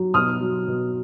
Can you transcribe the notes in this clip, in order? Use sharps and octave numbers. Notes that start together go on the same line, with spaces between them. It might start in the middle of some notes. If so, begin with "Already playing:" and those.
Already playing: F#3
B2 D#6 F6
F#3
B2